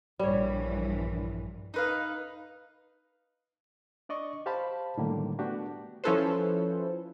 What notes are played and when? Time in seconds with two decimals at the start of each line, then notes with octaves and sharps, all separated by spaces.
0.19 A#1 G2 E3 G3 C#5
1.74 D#4 B4 F5
4.09 D4 D5 D#5 C#6
4.46 G4 C5 F5 A5 B5
4.98 A2 D3 D#3 F#3 G3 A#3
5.39 A3 B3 D4 F#4 G4
6.04 F3 C#4 E4 A4 B4 C5